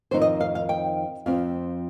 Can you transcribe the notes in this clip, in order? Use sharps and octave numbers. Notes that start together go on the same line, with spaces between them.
F2 D#3 C4 D#4 C5
D#5
F5
F5
G5
F2 F3 C4 F5